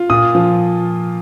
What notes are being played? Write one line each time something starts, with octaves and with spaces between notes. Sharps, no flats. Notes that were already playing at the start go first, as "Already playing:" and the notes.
Already playing: F4
A#2 D#6
F3